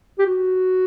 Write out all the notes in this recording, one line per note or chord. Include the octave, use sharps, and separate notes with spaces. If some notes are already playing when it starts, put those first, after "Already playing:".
G4
F#4